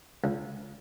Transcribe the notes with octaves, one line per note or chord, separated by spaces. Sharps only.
C#2